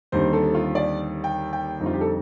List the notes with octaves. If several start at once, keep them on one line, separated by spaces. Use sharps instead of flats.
D#2 D3 G3 C4 D#4 C5
A4
F4
D5
G5
G5
F2 D3 G3 C4 D#4
F4
G4
A4